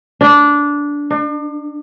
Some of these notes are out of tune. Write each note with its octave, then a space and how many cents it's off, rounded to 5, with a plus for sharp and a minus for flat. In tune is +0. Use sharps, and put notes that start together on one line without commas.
D4 -15
D4 +40